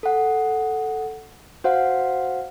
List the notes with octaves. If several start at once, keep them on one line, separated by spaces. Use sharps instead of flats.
A4 F#5
F#4 C5 F5 F#5